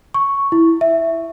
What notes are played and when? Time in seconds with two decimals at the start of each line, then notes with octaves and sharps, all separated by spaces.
0.14 C#6
0.52 E4
0.81 E5